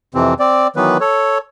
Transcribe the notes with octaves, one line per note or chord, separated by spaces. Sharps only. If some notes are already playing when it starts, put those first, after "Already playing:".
F2 C3 E3 C4
C4 D5
D#3 E3 F#3 B3 B4
A4 C#5